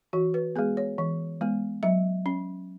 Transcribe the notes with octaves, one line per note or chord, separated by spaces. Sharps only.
E3 F#4
B4
G#3 B3 G#4
C#5
E3
G#3 B3
F#3 E5
C#4